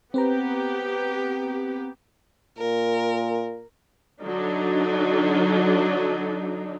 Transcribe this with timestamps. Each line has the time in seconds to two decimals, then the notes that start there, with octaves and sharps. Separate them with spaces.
0.14 B3 C4 G4 B4 A#5
2.58 A#2 A#4
4.23 D3 F#3 D4 D#4